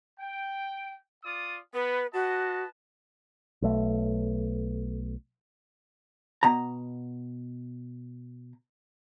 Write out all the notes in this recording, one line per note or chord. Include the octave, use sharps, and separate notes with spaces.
G5
F4 D5 D#6
B3 B4
F#4 B4 D#5 A5
B1 A3
B2 A#5